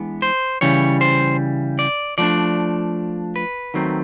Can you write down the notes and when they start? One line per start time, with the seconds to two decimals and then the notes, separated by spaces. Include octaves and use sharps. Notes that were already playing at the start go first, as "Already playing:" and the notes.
Already playing: E3 G#3 B3 D4
0.22 C5
0.61 C#3 E3 G3 C#5
1.01 C5
1.79 D5
2.18 F3 A3 D4 D5
3.36 B4
3.74 D#3 F#3 A3 C4